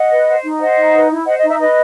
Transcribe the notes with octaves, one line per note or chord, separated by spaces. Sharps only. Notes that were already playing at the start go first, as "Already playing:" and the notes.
Already playing: D#5 F#5
B4
C5
D#4
C5 D#5 F#5
D#4
B4
E4
C5 D#5 F#5
D#5
D#4
E5
B4 D#5